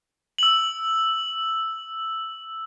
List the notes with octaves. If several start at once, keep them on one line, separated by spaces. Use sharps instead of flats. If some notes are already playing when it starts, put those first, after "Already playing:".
E6 F#7